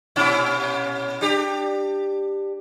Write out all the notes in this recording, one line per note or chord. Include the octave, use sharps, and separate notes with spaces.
A#2 C#4 E4
D4 G4